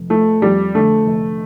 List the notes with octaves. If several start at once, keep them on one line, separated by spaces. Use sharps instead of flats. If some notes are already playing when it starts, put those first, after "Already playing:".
Already playing: F1
F3 A3
F2 G3
D3 A3
F1